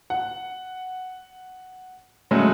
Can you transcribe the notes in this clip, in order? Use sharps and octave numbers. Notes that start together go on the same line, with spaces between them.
F#5
C#3 F#3 G#3 A3